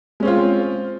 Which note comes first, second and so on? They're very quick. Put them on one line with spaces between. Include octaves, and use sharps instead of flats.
G#3 C#4 C4 F4